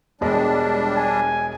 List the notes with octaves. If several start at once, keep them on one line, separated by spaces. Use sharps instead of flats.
E1 G3 G#3 D4
G#5